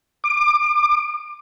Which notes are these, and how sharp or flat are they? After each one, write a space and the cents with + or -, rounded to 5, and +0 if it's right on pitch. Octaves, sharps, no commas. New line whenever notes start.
D6 +30